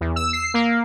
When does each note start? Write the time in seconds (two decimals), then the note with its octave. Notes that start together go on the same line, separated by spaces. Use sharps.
0.01 E2
0.16 E6
0.33 C7
0.54 A#3